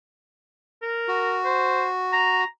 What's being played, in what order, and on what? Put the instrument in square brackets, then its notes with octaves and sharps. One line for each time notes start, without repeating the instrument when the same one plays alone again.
[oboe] A#4
[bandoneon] F#4
[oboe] C5
A#5